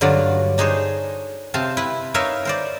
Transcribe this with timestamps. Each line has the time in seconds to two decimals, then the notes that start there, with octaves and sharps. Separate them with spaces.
0.01 G2 D3 F#3 F4 D5
0.58 D4 D#4 G#4 C5 C#5
1.54 C3 C4 F5 A5
1.77 E4 B4
2.14 D#4 A#4 B4 C#5 E5 F5
2.45 A#4 C5 D5